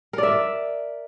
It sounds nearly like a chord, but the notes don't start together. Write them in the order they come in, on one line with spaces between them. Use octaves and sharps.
A#4 D5 E5